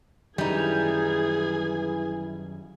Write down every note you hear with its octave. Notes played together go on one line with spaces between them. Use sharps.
F#2 D#3 E3 F#3 G3 D#4 G#4 G#5